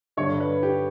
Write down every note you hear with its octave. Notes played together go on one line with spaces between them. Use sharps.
G2 D3 G3 C#5
B4
G4